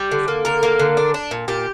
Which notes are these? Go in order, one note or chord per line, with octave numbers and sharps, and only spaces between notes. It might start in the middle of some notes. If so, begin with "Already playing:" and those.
Already playing: G3 G4
D3
A#3
D3 A#4
A#3
D3
D4
D4
A#2
A#2 G4